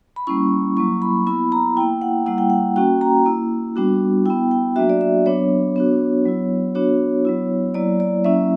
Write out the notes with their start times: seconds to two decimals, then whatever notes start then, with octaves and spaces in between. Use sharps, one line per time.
0.16 B5
0.27 G3 A#3 C#4 E4 C#6
0.77 F#3 A#3 E4 C#6
1.02 B5
1.27 B3 E4 B5
1.52 A#5
1.77 A#3 E4 G5
2.02 F#5
2.26 G3 A#3 E4 F#5
2.38 G5
2.50 F#5
2.76 A#3 C#4 F#4 G5
3.01 A#5
3.26 A#3 E4
3.76 G3 B3 D4 F#4
4.26 B3 E4 G5
4.51 G5
4.76 F#3 A#3 D4 F#4 E5
4.90 D5
5.01 E5
5.26 F#3 B3 D4 C#5
5.76 B3 D4 F#4
6.25 F#3 B3 E4
6.75 B3 D4 F#4 C#5
7.25 F#3 B3 E4
7.74 F#3 A#3 E4 D5
8.00 D5
8.24 F#3 A#3 C#4 E4 E5